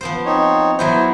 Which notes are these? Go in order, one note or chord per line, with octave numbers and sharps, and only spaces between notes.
F3 B3 C5
C4 D#4 C#5
F#3 B3 E4 F#4 C5